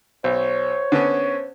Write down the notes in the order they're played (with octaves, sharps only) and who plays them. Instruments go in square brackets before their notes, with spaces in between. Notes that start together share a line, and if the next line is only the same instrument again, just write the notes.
[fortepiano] B1 [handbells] C5 [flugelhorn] C#5
[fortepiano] D3 B3 C#4